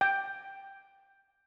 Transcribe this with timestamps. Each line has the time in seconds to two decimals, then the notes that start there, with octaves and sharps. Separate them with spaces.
0.01 G5